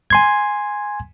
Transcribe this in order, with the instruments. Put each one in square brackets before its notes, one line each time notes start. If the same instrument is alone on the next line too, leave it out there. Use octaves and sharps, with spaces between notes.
[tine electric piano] G#5 C6 G#6